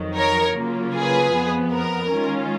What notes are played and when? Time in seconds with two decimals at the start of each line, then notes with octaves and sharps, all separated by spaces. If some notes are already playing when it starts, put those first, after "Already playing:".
Already playing: F2 D#3 F#3
0.16 A#4 C#5
0.55 C#3 F#3 A#3 F4
0.94 G#4 B4
1.33 F2 F3 B3
1.72 A#4
2.11 D#3 G#3 C#4 F4